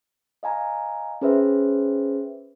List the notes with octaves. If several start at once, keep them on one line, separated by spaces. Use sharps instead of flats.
D#5 F5 G#5 A#5
C#4 G#4 B4 C5 E5